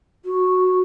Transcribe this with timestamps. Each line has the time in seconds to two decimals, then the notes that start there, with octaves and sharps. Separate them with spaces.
0.25 F#4